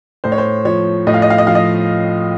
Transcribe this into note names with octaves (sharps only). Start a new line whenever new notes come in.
A2 C5
C#5
C5
F3 C#5
A2 D#5
F5
D#5
F5
D#5
F3 F5
D#5